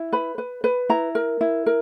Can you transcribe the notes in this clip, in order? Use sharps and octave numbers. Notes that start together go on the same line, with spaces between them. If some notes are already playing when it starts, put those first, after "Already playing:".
Already playing: E4
B4 B5
B4
B4
E4 A#5
A#4
E4
A#4